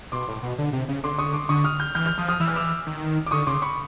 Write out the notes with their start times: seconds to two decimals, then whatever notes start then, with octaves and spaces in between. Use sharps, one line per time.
0.12 B2 C6 D6
0.28 A2
0.43 B2
0.58 D3
0.73 C3
0.88 C#3
1.04 D3 C6 D6
1.18 C#6 D#6
1.34 C6 D6
1.49 D3 C#6 D#6
1.64 D#6 F6
1.80 F6 G6
1.95 E3 F6 G6
2.06 F6 G6
2.18 F3 D#6 F6
2.29 D#6 F6
2.40 E3 E6
2.48 F6
2.56 D6 E6
2.86 D#3
3.26 D6
3.31 D3 C#6 D#6
3.47 C#3 C6 D6
3.62 B5 C#6